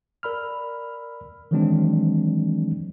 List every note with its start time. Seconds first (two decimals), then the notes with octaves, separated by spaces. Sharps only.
0.23 A#4 D5 B5 E6 F6
1.51 D#3 E3 F#3 G#3 C4 D4